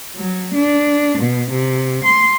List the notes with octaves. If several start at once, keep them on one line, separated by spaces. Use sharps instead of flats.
F#3
D4
B2
C3
C6